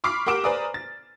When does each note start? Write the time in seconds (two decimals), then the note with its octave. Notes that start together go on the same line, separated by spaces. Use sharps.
0.04 B5 C#6 D6 F6 B6 C7
0.26 G4 A#4 F#5 D6 D7 E7
0.44 B4 C5 D5 G#5 A#5 D#6
0.74 A6